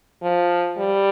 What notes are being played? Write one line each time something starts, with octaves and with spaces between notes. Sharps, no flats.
F3
G3